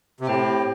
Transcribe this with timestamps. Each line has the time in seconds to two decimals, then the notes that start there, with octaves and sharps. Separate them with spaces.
0.20 C3
0.27 A2 C4 G4 C5 G5